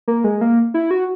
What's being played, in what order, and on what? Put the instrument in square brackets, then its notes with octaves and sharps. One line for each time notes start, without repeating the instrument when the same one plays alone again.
[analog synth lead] A#3
G#3
A#3
E4
F#4